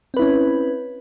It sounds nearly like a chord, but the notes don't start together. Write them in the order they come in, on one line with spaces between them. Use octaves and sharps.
C4 B4 E4 C#4